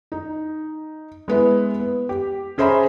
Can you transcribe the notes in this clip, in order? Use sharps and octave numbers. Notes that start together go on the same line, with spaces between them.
D#4
G#3 B3 E4
B3
G4
C#4 G#4 C5 E5 A#5 B5